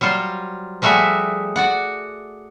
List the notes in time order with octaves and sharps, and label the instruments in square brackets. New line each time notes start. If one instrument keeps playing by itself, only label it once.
[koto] F#3 G3 F4 C5
F3 G3 A3 F#4 G#4 E5
F#4 D5 F#5